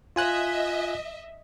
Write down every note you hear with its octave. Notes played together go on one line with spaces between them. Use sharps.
F4 D#5 E5 G#5 F#6